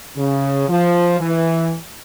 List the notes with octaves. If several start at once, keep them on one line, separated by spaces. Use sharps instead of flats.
C#3
F3
E3